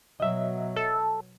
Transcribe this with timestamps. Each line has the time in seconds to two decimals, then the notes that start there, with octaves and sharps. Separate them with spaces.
0.20 B2 F#3 D#5 E5
0.76 A4